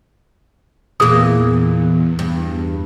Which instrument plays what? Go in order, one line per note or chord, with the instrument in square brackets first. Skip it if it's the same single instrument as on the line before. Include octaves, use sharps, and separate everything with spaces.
[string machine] E2 [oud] A#2 E3 [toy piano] G#4 D#6
[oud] G2